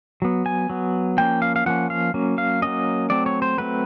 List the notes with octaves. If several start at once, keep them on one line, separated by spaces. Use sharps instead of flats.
F#3 B3
G#5
F#3 B3
F3 A#3 C#4 G5
F5
F5
F3 A#3 C#4 F#5
F5
F#3 A#3 C#4
F5
F#3 A#3 C#4 D#5
F#3 A3 C4 D5
C#5
C5
F#3 A3 C4 B4